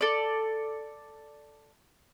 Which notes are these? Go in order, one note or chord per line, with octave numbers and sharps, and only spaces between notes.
A4 D5